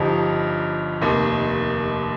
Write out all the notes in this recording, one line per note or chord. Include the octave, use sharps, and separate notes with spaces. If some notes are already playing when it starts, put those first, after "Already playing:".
Already playing: G1 G2 F3 D#4 G4
F1 D#2 D#3